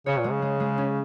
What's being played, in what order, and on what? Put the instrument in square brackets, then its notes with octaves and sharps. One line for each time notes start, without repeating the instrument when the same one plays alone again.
[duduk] C#3 [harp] C#5
[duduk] A#2
[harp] G#3
[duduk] C#3
[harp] G#3
G#3
C#4